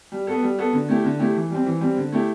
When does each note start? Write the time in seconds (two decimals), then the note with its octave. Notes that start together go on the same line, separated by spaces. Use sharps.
0.12 G3
0.27 B3 F#4 A4
0.43 G3
0.58 B3 F#4 A4
0.73 D3
0.89 A3 E4 G4
1.04 D3
1.19 A3 E4 G4
1.35 E3
1.50 G3 C4
1.66 E3
1.81 G3 C4
1.97 D3
2.12 A3 E4 G4